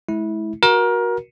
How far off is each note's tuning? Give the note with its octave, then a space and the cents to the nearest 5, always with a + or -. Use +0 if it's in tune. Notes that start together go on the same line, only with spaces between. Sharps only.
G#3 +40 E4 -20
F#4 -5 A#4 +25